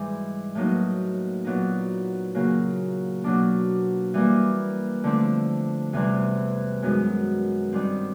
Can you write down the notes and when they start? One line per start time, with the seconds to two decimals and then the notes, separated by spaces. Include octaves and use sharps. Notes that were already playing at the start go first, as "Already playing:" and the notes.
Already playing: G#2 E3 G3
0.55 A2 F#3 A#3 D#4
1.44 A#2 F#3 B3 D#4
2.34 C#3 F#3 A#3
3.24 B2 F#3 A#3 D4
4.14 E3 G3 A#3
5.04 D3 F3 A3 C4
5.93 E2 C3 E3 G3 C4
6.83 F#2 D#3 G#3 B3
7.73 G2 D#3 G3 C4